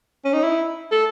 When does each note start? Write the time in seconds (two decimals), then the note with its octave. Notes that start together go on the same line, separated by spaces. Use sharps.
0.25 C#4
0.34 D#4
0.43 E4
0.92 A4